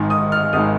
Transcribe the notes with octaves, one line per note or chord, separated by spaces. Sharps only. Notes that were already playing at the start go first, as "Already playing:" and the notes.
Already playing: G#1 G#2 D#3 G#3
D#6
F6
G#1 D#3 G#3 D#6